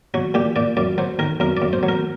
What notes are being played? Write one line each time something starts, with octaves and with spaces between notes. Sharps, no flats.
F#3 F#4
A#2 G4
A#2 D5
F#2 D5
F#3 C5
D#3 A#4
F#2 A#4
D5
F#2
C5
F#3
A#4